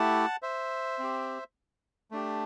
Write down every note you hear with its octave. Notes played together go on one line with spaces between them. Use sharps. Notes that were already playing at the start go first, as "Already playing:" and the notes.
Already playing: A3 E4 G4 F#5 A5
C5 E5
C4 G4
A3 D4 G4